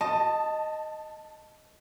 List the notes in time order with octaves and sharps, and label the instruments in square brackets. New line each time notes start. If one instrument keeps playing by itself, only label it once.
[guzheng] D#5 [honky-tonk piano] A5